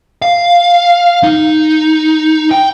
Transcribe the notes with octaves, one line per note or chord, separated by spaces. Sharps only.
F5
D#4
G5